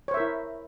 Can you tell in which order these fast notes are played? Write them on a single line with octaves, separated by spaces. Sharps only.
C#5 C5 E5 A#4 E4